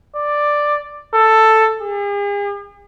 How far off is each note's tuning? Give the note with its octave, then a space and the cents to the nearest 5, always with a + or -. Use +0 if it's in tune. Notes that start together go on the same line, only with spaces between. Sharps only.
D5 +5
A4 +5
G#4 -40